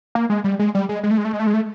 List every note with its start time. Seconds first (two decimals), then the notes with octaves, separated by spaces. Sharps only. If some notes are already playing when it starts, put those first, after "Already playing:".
0.15 A#3
0.29 G#3
0.44 G3
0.59 G#3
0.75 G3
0.89 G#3
1.03 G#3
1.11 A3
1.18 G#3
1.25 A3
1.33 G#3
1.40 A3
1.47 G#3
1.54 A3